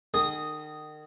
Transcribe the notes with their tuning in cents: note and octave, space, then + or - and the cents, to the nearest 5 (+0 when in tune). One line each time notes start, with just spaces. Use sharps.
D#3 -35 G#4 +0 D#6 +0